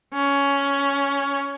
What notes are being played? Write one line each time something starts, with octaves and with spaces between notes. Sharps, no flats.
C#4